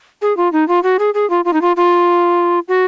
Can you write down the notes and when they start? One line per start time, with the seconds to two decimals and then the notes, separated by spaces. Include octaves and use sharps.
0.22 G#4
0.37 F4
0.52 D#4
0.68 F4
0.83 F#4
0.99 G#4
1.14 G#4
1.30 F4
1.45 F4
1.53 D#4
1.61 F4
1.76 F4
2.68 F#4